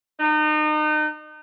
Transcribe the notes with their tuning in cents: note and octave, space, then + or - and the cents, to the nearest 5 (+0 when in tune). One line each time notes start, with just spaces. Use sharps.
D#4 -35